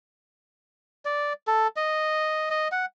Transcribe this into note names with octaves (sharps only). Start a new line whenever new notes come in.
D5
A4
D#5
D#5
F#5